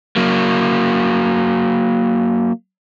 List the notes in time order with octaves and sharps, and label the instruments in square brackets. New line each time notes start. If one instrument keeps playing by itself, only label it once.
[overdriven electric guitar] F#3 A#3